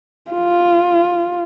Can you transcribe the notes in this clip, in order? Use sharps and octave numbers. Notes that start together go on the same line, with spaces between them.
F4